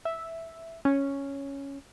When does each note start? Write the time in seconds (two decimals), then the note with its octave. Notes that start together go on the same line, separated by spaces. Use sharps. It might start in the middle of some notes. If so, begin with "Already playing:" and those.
0.05 E5
0.85 C#4